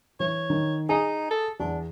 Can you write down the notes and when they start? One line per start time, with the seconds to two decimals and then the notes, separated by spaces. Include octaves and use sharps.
0.20 E3 C#5
0.50 D#3
0.89 D#4 G#4
1.31 A4
1.60 E2 D4